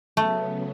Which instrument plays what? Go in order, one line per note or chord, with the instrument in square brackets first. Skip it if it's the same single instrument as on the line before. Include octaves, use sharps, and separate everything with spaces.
[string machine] C#3 F#3 B3 [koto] A3